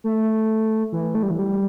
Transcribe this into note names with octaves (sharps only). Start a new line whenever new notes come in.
A3
E3
A3
G3
E3
G3